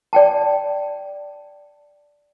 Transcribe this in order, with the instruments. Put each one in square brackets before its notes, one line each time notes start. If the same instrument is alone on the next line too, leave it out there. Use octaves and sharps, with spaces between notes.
[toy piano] D5 G5 A5